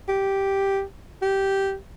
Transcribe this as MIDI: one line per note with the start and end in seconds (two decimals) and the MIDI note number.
0.09 0.83 67
1.22 1.75 67